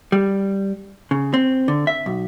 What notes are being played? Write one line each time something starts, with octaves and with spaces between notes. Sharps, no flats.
G3
C#3
C4
D3
E5
B1